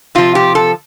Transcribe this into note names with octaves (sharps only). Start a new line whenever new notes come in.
C3 F3 F4
G4
A4